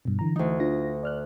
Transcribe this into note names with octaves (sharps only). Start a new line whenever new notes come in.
G2 B2
D3 E3 A#5
D2 E3 D#4
D4 F4 A#6
D5 F6 F#6